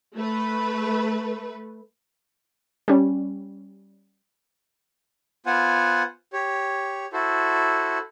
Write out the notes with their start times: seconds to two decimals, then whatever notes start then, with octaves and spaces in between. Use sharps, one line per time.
0.16 A3 B4
2.88 G3 C#4
5.46 B3 F4 C5 F#5 G#5
6.33 G4 C#5
7.13 E4 F#4 A4 C5